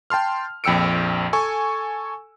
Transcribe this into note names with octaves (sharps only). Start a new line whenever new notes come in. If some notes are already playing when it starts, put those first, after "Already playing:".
G5 A5 C6 F6
A#1 F2 G5 E6 C#7 D7
A4 G#5 C#6